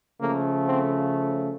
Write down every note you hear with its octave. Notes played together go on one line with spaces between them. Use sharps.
C#3 F3 A3 A#3
C4